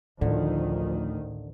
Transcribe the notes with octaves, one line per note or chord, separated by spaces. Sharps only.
A1 D2 A2 D3 D#3 F3